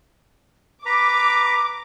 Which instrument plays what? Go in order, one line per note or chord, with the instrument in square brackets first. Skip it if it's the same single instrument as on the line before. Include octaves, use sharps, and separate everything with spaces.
[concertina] B4 A#5 [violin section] D6